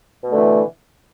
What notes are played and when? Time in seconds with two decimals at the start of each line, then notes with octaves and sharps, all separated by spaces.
0.23 B2
0.27 A3
0.31 D3
0.36 E3